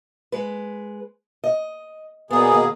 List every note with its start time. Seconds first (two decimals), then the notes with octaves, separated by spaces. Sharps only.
0.32 G#3 B4
1.44 D#5
2.31 E2 B2 A#3 B3 G#4
2.52 D#2 D#5